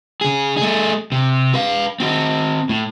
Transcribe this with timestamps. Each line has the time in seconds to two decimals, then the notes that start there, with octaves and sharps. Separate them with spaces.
0.21 C#3 G#4
0.57 A3 G#4
1.12 C3
1.54 B4 F5
2.00 C4 F#4
2.69 A2